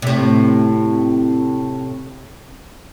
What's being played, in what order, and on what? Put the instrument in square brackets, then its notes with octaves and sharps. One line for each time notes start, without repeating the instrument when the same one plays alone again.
[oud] A2 C3